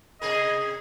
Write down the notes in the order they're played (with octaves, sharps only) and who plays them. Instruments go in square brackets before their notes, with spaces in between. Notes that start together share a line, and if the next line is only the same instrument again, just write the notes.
[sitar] C3 G#4 A#4 [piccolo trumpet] D#5